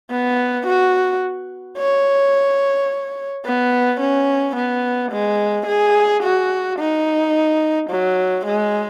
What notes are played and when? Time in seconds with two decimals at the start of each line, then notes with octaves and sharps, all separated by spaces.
0.11 B3
0.67 F#4
1.78 C#5
3.45 B3
4.00 C#4
4.56 B3
5.12 G#3
5.67 G#4
6.23 F#4
6.79 D#4
7.90 F#3
8.45 G#3